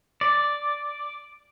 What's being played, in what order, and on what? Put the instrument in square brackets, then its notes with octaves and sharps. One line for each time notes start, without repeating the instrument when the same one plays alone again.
[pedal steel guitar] D5